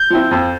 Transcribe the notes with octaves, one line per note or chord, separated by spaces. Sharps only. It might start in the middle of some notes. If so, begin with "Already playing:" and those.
Already playing: G6
F3 C4 E4
F2